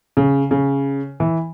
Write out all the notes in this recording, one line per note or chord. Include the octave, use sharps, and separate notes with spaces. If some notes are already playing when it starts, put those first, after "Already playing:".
C#3
C#3
E3